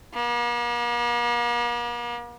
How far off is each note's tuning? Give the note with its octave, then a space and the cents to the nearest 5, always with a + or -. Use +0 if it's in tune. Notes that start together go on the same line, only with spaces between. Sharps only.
A#3 +45